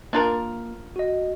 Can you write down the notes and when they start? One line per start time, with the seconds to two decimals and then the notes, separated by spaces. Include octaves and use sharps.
0.13 A#3 D4 F4 A#4
0.96 F#4 D#5